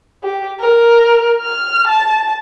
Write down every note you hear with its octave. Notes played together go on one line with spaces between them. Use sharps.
G4
A#4
F6
A5